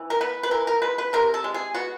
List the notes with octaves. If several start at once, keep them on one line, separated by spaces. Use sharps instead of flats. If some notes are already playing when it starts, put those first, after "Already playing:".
Already playing: E3
A#4
B3 B4
B4
E3 A#4
A#4
G#3 B4
B4
C3 A#4
A4
G#3
G#4
B3 F#4